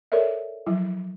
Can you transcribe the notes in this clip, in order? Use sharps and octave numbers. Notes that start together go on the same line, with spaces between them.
A4 A#4 C#5 D5 E5
F3 F#3 E4